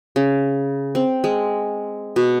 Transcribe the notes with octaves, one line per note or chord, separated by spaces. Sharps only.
C#3
C4
G#3
B2